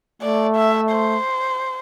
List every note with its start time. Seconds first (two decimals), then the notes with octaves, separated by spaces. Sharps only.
0.22 A3 D5
0.56 E5
0.92 C5